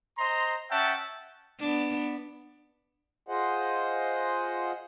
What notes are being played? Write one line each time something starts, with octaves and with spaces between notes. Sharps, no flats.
C5 D#5 A#5 C6
C#4 C#5 E5 F#5 G5 A5
B3 D4
F4 G#4 C5 D#5 F#5